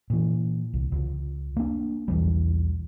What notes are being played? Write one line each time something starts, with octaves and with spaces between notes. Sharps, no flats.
A#2 E3
C2
C#2
A#3 D4
B1 E2 E3 G3